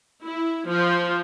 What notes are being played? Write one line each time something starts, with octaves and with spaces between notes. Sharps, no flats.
E4
F3